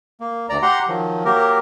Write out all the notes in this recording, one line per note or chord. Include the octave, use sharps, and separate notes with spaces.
A#3
D2 D5 A#5
G4 F#5 A#5 C6
D#3 F3 F#3
F#3 A#3 G4 A#4